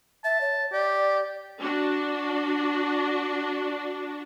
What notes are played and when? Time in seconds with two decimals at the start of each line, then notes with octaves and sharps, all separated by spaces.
0.25 E5 A5
0.41 C#5
0.72 G4 D5
1.60 D4 F#4